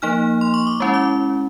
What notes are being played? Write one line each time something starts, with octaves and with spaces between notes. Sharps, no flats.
F3 A#3 D#4 F6
C6
C#6
D6
G#3 C#4 E4
D6